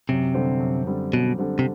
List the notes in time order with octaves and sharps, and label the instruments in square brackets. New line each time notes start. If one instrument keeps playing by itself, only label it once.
[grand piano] F#2 [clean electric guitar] C3
[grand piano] D3 G3 C4
F#2
D3 G3 C4
[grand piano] F#2 [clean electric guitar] B2
[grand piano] D3 G3 C4
[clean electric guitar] C3